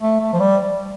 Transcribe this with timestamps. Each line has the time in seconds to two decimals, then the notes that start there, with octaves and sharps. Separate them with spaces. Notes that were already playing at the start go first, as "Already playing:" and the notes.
0.02 A3
0.21 A3
0.33 F3
0.40 G3